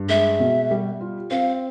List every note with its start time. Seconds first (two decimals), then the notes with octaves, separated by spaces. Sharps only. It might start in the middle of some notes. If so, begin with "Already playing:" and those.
Already playing: G2
0.09 G#3 E5
0.40 B2
0.71 G3
1.01 F4
1.31 C4 F5